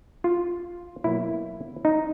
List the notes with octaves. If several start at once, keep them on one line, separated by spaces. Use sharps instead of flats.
F4
B2 F#3 A#3 E4
D#4